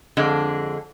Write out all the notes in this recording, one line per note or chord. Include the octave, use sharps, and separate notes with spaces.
F2 D3 G#3 D4